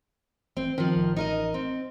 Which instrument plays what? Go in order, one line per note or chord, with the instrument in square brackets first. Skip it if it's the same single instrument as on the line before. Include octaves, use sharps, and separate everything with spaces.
[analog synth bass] A1 [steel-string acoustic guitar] C4
[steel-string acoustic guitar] D#3 F3 [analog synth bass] C4
[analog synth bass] A1
[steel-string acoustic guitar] D#4 A#4 D#5
C4